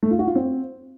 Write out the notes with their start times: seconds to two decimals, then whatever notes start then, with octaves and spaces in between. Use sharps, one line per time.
0.03 A3
0.11 F4
0.19 F#4
0.27 F4
0.35 C4